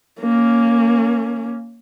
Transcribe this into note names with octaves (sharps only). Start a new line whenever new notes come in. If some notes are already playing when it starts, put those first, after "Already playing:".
A#3 C#4